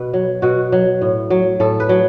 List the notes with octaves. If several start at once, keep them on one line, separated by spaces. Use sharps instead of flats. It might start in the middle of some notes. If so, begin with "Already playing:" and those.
Already playing: B2 B4
F#3
B2 F#4
F#3
A2
F#3
A2 A4
B4
F#3